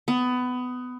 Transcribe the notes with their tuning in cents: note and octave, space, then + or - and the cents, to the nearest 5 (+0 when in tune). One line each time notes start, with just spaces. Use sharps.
B3 +20